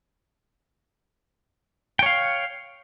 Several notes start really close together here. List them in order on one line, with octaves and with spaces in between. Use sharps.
G5 C#5 F5